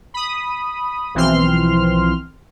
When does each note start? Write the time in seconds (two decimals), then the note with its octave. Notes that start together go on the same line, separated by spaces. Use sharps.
0.14 B5 D#6
1.14 B1 E3 F3 C4 C6 F6